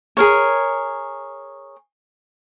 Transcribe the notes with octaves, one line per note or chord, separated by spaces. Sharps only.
G#4 A#4 C#5